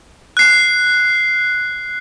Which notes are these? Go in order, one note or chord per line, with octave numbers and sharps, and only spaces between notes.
F#6 C7